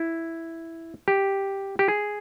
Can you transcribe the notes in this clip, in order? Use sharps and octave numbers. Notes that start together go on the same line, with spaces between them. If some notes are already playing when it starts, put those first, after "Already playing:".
Already playing: E4
G4
G4
G#4